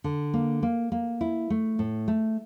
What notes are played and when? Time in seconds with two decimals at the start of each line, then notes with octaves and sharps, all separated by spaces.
0.04 D3
0.34 A#3
0.63 A#3
0.92 A#3
1.21 E4
1.50 A3
1.79 A2
2.08 A3